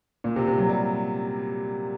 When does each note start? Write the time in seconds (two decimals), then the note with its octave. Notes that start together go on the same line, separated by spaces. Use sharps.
0.24 A#2
0.36 C3
0.47 C3
0.58 F#3
0.69 G3